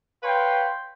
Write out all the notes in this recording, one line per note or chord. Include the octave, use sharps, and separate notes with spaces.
B4 C#5 F5 G5 C6